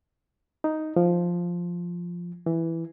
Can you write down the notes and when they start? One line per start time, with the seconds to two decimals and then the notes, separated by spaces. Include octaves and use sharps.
0.64 D#4
0.96 F3
2.46 E3